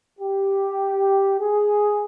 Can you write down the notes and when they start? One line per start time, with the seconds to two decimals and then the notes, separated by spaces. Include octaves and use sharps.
0.20 G4
1.41 G#4